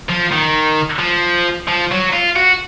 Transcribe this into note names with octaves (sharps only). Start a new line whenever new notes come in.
F3
D#3
F3
F3
F#3
F4
F#4